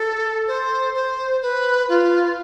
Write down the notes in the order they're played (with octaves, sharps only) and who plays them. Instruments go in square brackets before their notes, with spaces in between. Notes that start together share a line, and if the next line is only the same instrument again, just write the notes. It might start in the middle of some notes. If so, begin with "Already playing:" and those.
Already playing: [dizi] A4
C5
C5
B4
F4